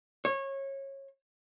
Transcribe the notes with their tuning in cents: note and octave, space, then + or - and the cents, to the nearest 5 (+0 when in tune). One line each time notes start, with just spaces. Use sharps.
C#5 -25